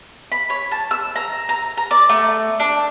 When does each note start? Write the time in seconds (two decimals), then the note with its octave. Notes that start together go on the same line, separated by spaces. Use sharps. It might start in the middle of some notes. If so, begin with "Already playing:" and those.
0.32 B5
0.50 C#5
0.72 A5
0.91 E6
1.16 A#5
1.49 A#5
1.77 A#5
1.91 D5
2.09 A3
2.60 D4